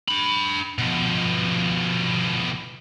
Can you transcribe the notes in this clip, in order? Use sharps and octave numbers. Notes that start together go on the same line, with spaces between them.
D4 B5
B2 F3